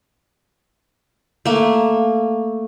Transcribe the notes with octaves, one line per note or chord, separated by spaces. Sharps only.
A3 A#3